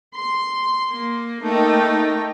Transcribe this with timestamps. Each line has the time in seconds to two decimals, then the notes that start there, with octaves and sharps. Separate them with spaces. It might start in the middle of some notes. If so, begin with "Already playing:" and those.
0.14 C6
0.92 A#3
1.43 A3 A#3 D#4 G5